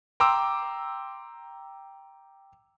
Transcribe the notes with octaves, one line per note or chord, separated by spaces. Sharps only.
G5 A#5 C6 D6 E6